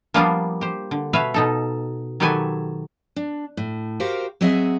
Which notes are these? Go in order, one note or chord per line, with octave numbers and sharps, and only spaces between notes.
F3 G3 A#3 B3 D4 F4
G4 C5
D3
B2 B4 C#5 E5 F5
B2 D#4 A4
D#3 F#3 G4 A4 B4 G#5
D4
A2
F#4 G4 A#4 C5 F5 G5
F#3 C4 G#4 D#5 E5 F#5